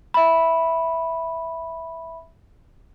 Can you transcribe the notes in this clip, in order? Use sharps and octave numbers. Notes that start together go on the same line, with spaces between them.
E5 B5